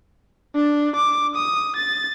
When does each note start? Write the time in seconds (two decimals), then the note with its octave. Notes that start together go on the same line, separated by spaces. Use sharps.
0.56 D4
0.96 D6
1.36 D#6
1.76 A6